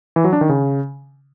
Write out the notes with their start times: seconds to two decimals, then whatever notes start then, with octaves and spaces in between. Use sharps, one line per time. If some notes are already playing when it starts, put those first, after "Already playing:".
0.16 E3
0.24 F#3
0.33 D4
0.41 D#3
0.49 C#3